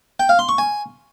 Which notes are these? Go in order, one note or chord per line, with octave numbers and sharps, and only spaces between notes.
G5
F5
C6
C#6
G#5